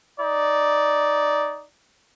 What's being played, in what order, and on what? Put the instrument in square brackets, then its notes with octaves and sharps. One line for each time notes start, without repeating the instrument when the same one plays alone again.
[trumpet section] D#4 D5